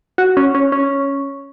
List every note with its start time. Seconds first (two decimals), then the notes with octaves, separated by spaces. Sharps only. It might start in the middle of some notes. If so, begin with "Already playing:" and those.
0.18 F#4
0.37 C#4
0.55 C#4
0.72 C#4